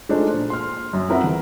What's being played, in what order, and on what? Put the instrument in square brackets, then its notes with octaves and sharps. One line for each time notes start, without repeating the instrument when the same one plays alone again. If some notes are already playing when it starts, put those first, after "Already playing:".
[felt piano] G#3 A3 D4 D#4 F4 C5
A#2
C6 F6
F#2
C4 F4 A#4 B4 E5 F#5
E2